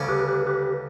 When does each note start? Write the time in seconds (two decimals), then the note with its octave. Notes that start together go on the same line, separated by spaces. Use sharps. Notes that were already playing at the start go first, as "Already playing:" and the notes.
Already playing: D2 C#3 G3 C#4
0.08 G4 B4
0.28 G4 B4
0.47 G4 B4